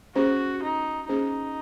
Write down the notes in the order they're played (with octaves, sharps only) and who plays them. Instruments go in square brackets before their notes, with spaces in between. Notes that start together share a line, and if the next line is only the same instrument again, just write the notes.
[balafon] A#3 C#4 G#4 C5 [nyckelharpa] F#4
[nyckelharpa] D#4
[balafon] A#3 C#4 G#4 C5 [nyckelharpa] D#4